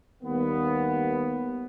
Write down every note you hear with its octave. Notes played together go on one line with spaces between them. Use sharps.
D#2 G3 A#3 B3